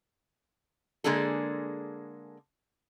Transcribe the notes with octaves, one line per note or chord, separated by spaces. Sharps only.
D3 G#3 A#3 D4 G#4 A4